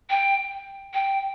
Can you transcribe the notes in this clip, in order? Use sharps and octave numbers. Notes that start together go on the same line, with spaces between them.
G5
G5